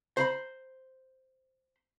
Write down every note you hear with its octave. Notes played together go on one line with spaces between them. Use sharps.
C5 A#5 B5